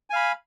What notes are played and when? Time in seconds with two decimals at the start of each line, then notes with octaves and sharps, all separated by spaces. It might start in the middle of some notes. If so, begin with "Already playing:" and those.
0.10 G#5
0.13 F5
0.16 B5